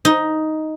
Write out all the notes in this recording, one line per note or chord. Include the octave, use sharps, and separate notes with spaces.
D#4